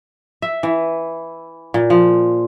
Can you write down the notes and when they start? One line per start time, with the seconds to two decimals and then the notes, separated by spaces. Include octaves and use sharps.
0.42 E5
0.63 E3
1.74 A#2
1.90 F3